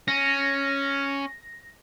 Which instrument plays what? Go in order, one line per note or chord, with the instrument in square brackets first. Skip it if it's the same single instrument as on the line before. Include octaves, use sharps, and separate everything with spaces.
[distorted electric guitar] C#4 [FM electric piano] A#6